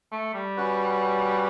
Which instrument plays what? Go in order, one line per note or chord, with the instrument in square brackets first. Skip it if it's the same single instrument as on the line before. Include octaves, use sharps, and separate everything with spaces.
[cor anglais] A3
G3
[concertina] C#4 F#4 B4 F#5